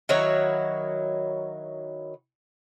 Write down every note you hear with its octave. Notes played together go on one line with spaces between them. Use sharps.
D#3 F#3 E4 C#5